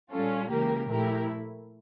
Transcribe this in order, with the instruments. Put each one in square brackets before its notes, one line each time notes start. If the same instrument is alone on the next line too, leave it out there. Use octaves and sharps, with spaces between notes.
[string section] A#2 G3 C#4 F4 A4
C#2 C#3 E3 A#3 G4 A#4
A#2 F3 A3 E4 G4 A#4